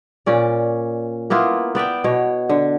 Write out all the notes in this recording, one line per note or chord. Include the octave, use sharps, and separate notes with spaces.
A#2 C#4 D5
A#3 B3 E4 F4
B3 D5 E5 G5
B2 C#5
D3